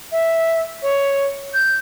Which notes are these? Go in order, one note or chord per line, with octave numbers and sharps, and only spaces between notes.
E5
C#5
G6